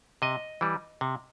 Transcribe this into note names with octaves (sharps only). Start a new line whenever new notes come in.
C3 D#5
E3 G3
C3